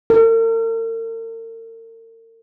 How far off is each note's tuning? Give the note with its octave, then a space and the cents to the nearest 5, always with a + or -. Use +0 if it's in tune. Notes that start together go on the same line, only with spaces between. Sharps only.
A#4 -45